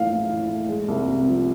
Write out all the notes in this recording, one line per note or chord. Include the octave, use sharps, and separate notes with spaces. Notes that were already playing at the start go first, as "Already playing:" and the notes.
Already playing: A2 E3 A3 F5
A2
E3
A3
G#3
C2
C3
F3